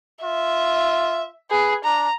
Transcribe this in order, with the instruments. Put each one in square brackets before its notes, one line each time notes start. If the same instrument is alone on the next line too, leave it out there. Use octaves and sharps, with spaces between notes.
[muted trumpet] F4 [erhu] E5
[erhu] G#4 [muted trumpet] B4
[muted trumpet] D4 [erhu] A#5